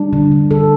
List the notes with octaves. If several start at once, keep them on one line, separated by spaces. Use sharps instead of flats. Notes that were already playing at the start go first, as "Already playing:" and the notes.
Already playing: G3 D4
D3
D3
D3 A4